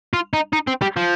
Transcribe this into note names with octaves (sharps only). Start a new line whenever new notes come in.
F4
D#4
D#4
C4
G3
F3